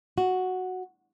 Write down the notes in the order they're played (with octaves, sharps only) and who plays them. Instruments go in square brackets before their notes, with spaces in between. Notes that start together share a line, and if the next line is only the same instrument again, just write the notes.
[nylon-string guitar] F#4